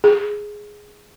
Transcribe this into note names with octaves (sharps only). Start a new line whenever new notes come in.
G#4